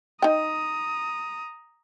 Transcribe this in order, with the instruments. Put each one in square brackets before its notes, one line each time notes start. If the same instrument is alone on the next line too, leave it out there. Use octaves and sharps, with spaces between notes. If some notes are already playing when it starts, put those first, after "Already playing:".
[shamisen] D#4 G5 [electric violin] A#5 D#6